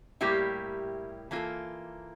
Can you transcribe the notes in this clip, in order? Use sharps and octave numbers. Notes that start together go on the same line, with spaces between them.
A2 G3 A#3 E4 G4
E3 A#3 F4 A4